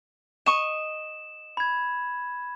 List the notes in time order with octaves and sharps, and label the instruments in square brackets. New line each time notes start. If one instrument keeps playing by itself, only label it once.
[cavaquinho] D#5 C#6 [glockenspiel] E7
[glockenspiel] B5 G#6